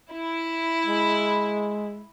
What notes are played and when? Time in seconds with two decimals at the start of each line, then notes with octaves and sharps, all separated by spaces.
0.12 E4
0.86 G#3